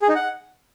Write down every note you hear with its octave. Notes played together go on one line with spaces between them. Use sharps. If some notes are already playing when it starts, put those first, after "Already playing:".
G#4
D#4
F#5